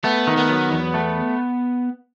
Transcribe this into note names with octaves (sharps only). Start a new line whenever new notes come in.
A3 B3
D#3
B3
F#3
E2
A3